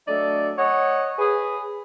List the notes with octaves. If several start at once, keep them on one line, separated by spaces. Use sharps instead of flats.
F#3 A3 D4 A4 D5 D#5
C#5 D#5 F#5
G#4 B4